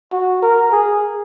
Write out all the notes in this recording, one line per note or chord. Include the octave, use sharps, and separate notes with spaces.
F#4
A#4
G#4